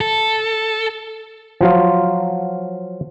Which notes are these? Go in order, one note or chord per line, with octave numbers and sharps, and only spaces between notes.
A4
F3 F#3 F4